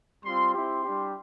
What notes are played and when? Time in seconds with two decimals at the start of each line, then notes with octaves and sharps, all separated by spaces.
0.24 G3 C4 F4 C6
0.54 C4 E4 G4 C6
0.84 G3 D4 G4